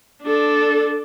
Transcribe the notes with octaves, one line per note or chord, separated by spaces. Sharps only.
D4 A4